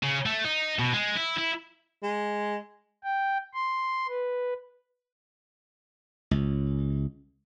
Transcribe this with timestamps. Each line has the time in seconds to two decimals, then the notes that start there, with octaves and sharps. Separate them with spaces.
0.03 C#3
0.26 A3
0.45 D#4
0.79 B2
0.93 G#3
1.16 E4
1.38 E4
2.03 G#3
3.04 G5
3.54 C6
4.08 B4
6.31 C#2